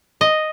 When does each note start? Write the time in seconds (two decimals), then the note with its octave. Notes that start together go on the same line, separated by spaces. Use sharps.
0.21 D#5